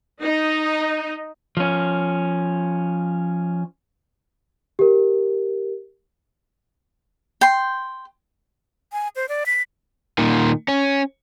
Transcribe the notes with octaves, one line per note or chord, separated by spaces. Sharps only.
D#4
F3 C#4
G4 A#4
G5 C6
G#5
C5
D5
B6
A#2 D#3
C#4